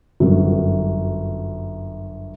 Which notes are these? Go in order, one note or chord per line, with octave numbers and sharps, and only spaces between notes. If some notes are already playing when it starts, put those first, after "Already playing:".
G1 F#2